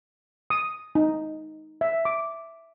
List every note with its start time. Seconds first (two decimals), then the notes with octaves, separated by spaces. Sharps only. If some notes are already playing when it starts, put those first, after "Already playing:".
0.50 D#6
0.95 D#4
1.81 E5
2.05 D6